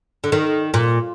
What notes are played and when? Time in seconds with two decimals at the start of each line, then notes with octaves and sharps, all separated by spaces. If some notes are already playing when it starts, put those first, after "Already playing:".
0.24 D3
0.32 D#3
0.74 A#2